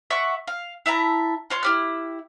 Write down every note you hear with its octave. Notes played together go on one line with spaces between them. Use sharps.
E5 F#5 C#6 D6
F5
E4 E5 A5 A#5
F4 C#5 C6
E4 G4 F6